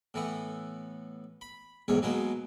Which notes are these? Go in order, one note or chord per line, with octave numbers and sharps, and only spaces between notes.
A2 E3 B3
B5
B1 E2 G#2 D#3 C#5
B2 F#3 G#3 A#3 B3